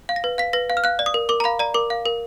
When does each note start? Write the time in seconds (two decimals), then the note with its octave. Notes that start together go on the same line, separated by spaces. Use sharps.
0.09 F5
0.16 A#6
0.24 B4
0.38 F5 B6
0.53 B4 A#6
0.70 F5
0.77 F6
0.84 F5 F#6
0.99 D5
1.06 D#6
1.14 A#4
1.29 A#4 D6
1.40 A#5
1.44 F5 B5
1.59 D5 A#5
1.74 A#4 D6
1.90 F5
2.06 A#4